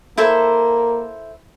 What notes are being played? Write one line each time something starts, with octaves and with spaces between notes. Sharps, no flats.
A#3 E4 A4 C5